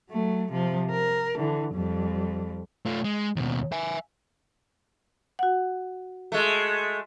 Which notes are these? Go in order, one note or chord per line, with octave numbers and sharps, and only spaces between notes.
F#3 A3
C3 F3
A#4
D3 E3
F2 G3
A3 F4
G#3
D#2 B2
E5 G#5
F#4 F#5
G#3 A3